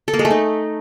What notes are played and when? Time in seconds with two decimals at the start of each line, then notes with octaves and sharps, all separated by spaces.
0.08 A4
0.13 A#3
0.19 G#3
0.25 A3
0.31 D#4